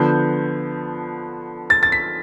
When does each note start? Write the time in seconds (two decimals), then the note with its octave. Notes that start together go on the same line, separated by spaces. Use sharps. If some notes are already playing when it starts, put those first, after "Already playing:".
Already playing: D3 F3 B3 G6
1.70 A6
1.83 A6
1.92 B6